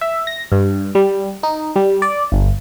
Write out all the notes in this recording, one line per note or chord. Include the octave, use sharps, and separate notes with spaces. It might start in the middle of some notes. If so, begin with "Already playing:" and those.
E5
A#6
G2
G3
D#4
G3
D5
G1